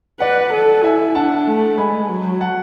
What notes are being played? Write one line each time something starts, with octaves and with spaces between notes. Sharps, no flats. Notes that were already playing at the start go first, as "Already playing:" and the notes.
B4 D5 F#5
A4
E4 E5 G#5
D4 F#5 A5
A3
G#3 G#5 B5
F#3
F#5 A5